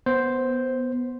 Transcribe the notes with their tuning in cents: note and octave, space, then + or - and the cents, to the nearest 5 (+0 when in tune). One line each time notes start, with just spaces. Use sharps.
B3 +0 C5 +0